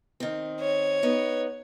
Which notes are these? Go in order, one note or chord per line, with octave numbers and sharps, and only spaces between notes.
D#3 C4
C#5
B3 D#4